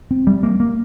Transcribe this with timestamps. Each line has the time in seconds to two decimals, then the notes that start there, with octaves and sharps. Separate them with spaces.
0.11 C4
0.27 G3
0.43 A#3
0.60 A#3